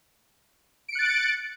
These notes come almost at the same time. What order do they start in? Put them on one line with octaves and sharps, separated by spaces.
D7 C#7 F#6 A6